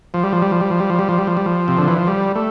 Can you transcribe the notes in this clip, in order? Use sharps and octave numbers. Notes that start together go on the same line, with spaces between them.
F3
G3
F3
G3
F3
G3
F3
G3
F3
G3
F3
G3
F3
G3
F3
C3
D3
E3
F3
G3
A3